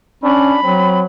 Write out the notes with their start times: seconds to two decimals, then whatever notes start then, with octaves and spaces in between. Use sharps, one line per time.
0.23 C#4 D4 B5
0.63 F#3 C4